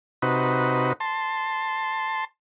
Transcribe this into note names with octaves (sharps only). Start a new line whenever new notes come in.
C3 D#4 F#4 B4
A5 C6